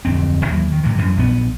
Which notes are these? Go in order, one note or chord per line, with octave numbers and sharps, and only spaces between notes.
D1 F2 C4
D#2 E3 F#3 A#3
D#3
A2 C3 E3
F#2 E3
A#1 B3